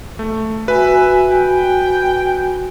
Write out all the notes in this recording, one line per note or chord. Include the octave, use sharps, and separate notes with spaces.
A3
F#4 B4 E5 G#5
G5